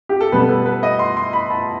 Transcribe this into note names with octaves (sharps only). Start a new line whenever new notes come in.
G4
A4
B2 G3 B3 B4
A4
B4
D#5
C6
C6
B5
A5